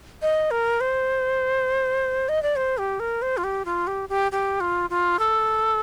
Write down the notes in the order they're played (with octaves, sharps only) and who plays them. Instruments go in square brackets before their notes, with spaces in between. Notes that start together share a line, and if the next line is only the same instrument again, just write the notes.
[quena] D#5
A#4
C5
D#5
D5
C5
G4
A#4
C5
F4
G4
F4
G4
G4
G4
F4
F4
A4